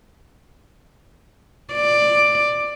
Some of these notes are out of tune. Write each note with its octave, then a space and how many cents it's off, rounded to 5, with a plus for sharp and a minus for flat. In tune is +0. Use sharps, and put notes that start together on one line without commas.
D5 +10